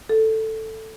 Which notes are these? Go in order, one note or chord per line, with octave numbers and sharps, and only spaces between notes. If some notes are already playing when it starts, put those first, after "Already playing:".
A4